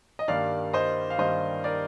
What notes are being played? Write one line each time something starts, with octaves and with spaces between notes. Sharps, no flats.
D#5
G2 D#3 G3 A#3 D5 F5
C5 D#5
F5
G2 D#3 G3 A#3 C5 D#5
A#4 D5